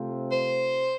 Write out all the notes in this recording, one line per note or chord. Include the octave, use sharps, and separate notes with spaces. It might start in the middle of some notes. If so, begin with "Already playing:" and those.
Already playing: C3 A3 C4 F4
C5